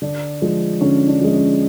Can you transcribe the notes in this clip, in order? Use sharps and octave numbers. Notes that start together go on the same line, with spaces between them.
D3 D4
F3 G#3
D3 C#4
D4
F3 G#3
C#4